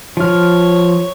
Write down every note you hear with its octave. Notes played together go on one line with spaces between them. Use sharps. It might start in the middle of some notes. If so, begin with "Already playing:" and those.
F3 C#5 F6